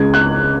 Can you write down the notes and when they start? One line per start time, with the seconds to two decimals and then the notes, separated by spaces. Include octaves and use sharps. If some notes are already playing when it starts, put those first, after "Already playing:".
Already playing: C#2 C#3 G#3 G#6
0.14 F#6